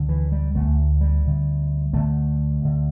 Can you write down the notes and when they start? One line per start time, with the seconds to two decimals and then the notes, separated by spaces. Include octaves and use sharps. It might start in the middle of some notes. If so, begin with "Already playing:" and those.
Already playing: D2 D3
0.09 E3
0.32 G3
0.55 D2 D3 A3
1.01 G3
1.25 D2 D3
1.93 D2 D3 A3
2.62 D2 D3